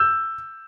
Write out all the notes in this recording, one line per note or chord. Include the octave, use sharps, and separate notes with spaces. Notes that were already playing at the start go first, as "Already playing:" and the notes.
Already playing: E6 G6